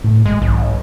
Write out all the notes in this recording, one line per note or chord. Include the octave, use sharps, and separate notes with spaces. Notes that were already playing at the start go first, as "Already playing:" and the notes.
A2
G#1 G#3
B1